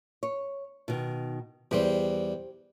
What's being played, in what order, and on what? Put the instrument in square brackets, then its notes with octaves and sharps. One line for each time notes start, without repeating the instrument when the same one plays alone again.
[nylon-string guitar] C#5
B2 D#3
[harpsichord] E2 G3 [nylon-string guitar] G4 C5